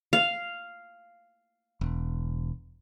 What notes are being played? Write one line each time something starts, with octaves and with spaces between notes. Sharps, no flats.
F5
E1